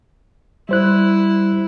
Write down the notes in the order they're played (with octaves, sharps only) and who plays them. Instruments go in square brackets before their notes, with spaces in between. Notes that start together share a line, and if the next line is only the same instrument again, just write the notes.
[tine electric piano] G3 C5 F#6 [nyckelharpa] E4